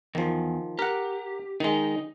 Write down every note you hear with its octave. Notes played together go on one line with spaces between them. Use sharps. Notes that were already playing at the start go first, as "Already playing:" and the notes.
E2 D#3 F3
G4 A#4 F#5
D#3 G#3 D#4 D#5